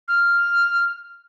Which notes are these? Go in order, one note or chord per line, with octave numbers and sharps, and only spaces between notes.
F6